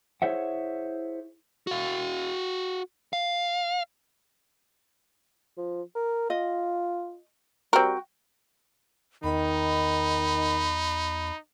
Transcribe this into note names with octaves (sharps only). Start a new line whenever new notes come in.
E4 G#4 C5 C#5 E5 F#5
F#4 F5
F5
F3
A#4
F4 D#5
G3 C4 F#4 A#4 G5
E2 D#3 D#4 B5